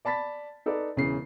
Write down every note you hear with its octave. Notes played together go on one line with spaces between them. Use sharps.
D5 A5 B5 A6 B6
D#4 A4 B4 D5
E1 C#3 E3 C7